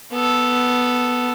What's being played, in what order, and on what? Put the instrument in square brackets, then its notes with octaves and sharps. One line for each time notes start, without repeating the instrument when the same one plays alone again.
[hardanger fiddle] B3 A4